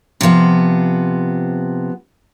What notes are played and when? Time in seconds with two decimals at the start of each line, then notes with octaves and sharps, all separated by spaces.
0.21 C3 F3 B3